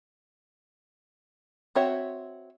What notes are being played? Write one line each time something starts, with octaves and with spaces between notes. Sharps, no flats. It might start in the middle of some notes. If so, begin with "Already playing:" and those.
C4 F#4 C#5 E5